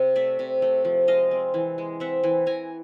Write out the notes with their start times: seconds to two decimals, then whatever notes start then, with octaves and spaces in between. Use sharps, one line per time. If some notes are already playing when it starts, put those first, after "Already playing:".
Already playing: C3
0.16 A3 D5 E5
0.39 C3
0.62 A3
0.85 F3
1.08 G#3 D#5 F5
1.31 C4
1.54 E3
1.78 G#3
2.00 C4 E5 F#5
2.24 E3
2.46 E3 G#5 A#5